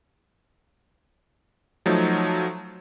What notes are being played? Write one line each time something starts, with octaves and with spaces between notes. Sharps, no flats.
F3 F#3 A3 D#4